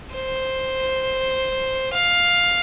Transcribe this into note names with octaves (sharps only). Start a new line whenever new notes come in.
C5
F5